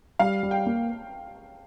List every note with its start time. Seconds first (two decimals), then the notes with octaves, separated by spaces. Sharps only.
0.19 G3 F5
0.43 G3
0.51 G5
0.66 A#3